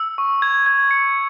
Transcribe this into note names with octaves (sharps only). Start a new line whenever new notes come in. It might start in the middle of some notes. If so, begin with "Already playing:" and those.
Already playing: E6
C#6
G#6
G#6
C#7